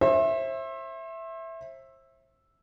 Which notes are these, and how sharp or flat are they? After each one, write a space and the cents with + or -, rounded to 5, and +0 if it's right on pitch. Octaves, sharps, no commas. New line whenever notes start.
C5 +40 E5 +0